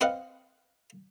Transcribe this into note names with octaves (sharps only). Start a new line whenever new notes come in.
C4 B4 D#5 F5 F#5